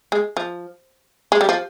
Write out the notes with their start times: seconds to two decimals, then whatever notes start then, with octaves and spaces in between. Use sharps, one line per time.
0.12 G#3
0.37 F3
1.32 G#3
1.41 G3
1.49 F3